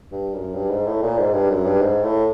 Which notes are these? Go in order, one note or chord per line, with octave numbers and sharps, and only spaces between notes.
G2
F#2
G2
G#2
A2
A#2
G#2
G2
F#2
G2
G#2
A2